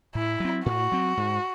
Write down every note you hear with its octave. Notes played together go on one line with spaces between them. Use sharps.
A2 E4
F#3 C4
A2 F#4
F#3 C4
G#2